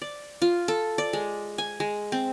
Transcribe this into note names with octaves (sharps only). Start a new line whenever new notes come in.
D5
F4
A4
D5
G#3
G#5
G#3
C4